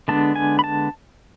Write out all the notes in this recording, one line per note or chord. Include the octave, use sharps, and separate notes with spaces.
D3 G#3 B3 D4 A5
G#5
B5
A5